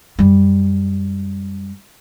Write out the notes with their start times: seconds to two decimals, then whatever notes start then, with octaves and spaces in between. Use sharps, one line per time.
0.19 F#2 G3